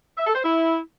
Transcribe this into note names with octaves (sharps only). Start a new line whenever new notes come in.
E5
A4
C5
E4